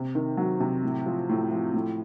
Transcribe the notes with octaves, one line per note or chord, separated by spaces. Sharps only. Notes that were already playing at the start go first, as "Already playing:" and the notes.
Already playing: C3
D#3
F#3
C3
A2
F3
A2
F3
A2